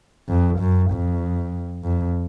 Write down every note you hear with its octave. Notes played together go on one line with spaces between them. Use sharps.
F2
F#2
F2
F2